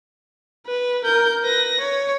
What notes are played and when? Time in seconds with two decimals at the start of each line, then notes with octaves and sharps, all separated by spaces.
0.67 B4
1.05 A#4 G6
1.44 B4 A#6
1.81 C#5